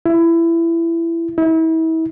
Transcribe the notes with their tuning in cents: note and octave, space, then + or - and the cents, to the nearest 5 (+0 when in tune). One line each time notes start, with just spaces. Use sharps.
E4 +20
E4 -35